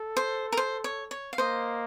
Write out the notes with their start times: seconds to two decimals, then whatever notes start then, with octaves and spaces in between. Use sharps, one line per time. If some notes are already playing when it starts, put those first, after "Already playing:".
Already playing: A4
0.17 C5
0.52 A#4
0.57 C5
0.84 C#5
1.11 C#5
1.33 F5
1.38 A#3 C5 D#5